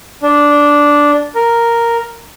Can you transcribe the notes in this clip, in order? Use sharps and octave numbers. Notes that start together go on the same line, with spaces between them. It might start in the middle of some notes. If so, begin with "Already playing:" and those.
D4
A#4